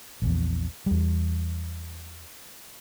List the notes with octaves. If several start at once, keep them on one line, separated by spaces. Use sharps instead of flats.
A#1 E2
E2 G3